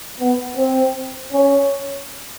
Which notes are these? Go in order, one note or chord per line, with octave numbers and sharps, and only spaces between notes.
B3
C4
C#4